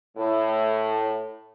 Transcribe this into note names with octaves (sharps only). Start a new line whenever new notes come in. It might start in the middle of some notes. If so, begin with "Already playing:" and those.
A2